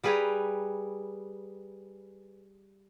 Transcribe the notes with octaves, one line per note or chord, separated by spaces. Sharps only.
G3 G#4 B4 C#5 G5 A#5